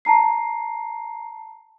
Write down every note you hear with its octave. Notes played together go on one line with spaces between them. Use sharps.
A5 A#5 C7